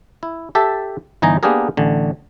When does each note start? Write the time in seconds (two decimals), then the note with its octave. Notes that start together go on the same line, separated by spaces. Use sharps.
0.23 E4
0.55 G4 A4 E5 A5
1.22 G1 E3 D#4 G#5 A#5
1.43 A#3 B3 D4 G4 G#4 A#4
1.77 A1 D3